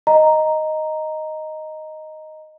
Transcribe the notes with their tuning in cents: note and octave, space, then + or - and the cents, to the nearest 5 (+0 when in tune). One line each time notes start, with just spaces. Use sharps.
D#5 +0 A#5 +0